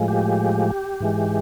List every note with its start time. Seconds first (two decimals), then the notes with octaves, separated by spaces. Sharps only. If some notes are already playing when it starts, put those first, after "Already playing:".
Already playing: A2 F3 G#3
0.08 G4
1.00 G#2 E3 G#3